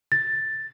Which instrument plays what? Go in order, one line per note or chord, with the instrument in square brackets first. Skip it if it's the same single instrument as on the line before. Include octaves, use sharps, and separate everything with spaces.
[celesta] A6